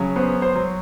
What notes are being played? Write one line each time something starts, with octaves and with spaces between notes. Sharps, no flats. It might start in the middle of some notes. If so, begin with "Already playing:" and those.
Already playing: C#3 F#3
B3 C5
C5
F#3